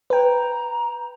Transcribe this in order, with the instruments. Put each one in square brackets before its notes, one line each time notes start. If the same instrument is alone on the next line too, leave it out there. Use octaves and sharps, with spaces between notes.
[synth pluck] B4 G5 [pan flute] A#5